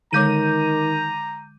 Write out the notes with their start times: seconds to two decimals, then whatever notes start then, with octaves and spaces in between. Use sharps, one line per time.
0.13 D3 D#3 G#3 C#5 A#5 D6 G6 D#7